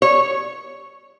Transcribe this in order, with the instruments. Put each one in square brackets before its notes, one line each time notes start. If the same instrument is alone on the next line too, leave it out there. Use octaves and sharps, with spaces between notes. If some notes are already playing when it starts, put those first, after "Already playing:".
[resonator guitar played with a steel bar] C#5